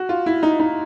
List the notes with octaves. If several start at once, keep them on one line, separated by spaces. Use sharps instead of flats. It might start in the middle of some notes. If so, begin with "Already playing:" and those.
Already playing: F#4
F4
E4
D#4
D#4